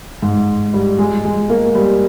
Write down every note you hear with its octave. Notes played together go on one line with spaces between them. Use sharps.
G#2
G3
G#3
G#3
A#3
G3